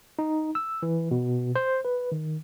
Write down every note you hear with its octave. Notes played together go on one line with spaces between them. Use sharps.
D#4
E6
E3
B2
C5
B4
D#3